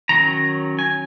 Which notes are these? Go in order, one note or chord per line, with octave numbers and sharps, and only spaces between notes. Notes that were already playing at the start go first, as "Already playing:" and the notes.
D#3 F#3 C#4 A#5
G#5